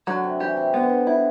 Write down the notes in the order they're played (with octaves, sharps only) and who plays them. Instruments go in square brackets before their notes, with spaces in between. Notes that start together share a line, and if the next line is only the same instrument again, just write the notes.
[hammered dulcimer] D3 [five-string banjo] F#3
[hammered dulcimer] C3
[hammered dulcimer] E3 [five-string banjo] G4
[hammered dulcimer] C3
[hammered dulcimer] D3 [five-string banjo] B3
[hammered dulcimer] D3
[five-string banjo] E4